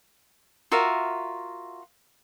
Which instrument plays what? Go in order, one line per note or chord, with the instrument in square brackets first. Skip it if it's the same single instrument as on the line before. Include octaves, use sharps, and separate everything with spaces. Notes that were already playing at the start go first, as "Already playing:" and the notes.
[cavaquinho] F4 F#4 A#4 E5